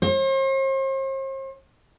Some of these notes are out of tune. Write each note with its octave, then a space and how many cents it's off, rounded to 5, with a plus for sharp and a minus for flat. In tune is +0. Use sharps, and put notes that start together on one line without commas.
C5 +45